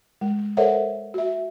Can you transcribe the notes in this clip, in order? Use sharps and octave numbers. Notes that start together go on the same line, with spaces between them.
G#3
A4 A#4 C5 C#5 E5 F#5
F#4 E5